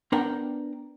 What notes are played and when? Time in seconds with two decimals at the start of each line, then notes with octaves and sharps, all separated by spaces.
0.12 B3 D4 A#4 G5 A#5